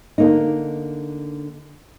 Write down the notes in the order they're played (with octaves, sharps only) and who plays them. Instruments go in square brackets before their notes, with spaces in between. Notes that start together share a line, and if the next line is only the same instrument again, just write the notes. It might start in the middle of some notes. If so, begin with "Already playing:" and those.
[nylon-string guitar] D3 A#3 D#4